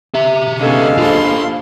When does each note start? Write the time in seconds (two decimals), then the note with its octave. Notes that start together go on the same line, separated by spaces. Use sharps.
0.15 G4 E5
0.61 D3 G#3 B3 C#4 D#4 A4 F5
0.98 D#2 F3 D4 F4 C6